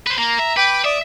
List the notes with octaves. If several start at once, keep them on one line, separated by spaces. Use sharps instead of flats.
B4 C5
A#3 A#5
E5
B4 G5 D6
D5 E5 D6 D#6